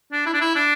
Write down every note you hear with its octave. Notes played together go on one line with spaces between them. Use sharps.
D4
E4
D4
E4
D4